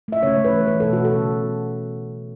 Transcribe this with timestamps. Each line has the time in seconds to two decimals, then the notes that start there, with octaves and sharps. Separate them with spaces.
0.08 A3 E5
0.23 C#3 C#5
0.38 A3
0.45 B4
0.53 E3
0.66 A3 B4
0.80 B2 A4
0.93 A3 F#4
1.05 A4
1.12 C#3